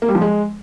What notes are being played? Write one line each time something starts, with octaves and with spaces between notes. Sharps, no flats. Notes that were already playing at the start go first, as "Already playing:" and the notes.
A#3
G3
F3
G#3